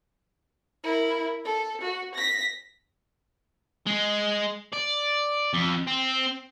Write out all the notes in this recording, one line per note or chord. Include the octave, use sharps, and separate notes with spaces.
E4 A#4
A4
F#4
A#6 B6
G#3
D5
F2
C4